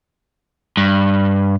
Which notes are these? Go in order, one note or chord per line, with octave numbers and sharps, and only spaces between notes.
G2